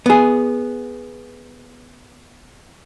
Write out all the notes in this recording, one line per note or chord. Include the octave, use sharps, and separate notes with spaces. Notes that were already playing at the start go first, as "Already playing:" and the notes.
B3 G#4